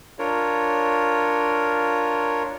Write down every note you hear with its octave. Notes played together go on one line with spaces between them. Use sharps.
D4 F4 A#4 C#5